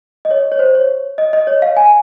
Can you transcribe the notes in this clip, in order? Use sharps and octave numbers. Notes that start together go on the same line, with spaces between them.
D#5
C#5
C#5
C5
C#5
D#5
D#5
C#5
F5
G#5